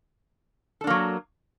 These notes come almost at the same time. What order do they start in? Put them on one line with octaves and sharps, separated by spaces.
A4 D4 A#3 F#3